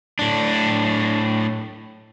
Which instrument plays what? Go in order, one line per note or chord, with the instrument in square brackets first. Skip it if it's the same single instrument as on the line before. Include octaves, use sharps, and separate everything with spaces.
[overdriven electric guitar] A2 D4